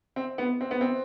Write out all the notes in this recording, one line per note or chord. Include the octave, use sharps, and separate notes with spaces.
C4
B3
C4
B3
C4